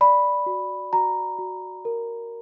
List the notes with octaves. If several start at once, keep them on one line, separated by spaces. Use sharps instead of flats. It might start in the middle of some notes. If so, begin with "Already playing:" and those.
D5 B5
F#4
F#4 A#5
F#4
A#4